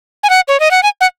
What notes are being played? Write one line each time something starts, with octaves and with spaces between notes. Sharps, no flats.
G#5
F#5
C#5
D#5
F#5
G#5
F#5